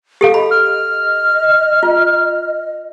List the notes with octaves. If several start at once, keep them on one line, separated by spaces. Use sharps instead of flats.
G4 A4 F5
D#5 B5
F6
F4